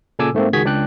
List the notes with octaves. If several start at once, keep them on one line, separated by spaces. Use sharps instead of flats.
A#2 C#3 A4 G#5 D6 E6
G#2 A3 A#3 C4
C#2 D#3 F#4 G#4 G#6 B6
C#2 D4 D5 G5 F#6